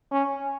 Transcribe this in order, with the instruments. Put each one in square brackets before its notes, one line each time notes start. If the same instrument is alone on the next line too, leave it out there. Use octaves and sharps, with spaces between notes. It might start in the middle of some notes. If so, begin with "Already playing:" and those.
[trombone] C#4